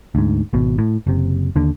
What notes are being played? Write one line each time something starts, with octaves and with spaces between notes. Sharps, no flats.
D2 G#2
G#1 B2
A2
F#1 C3
D#2 D3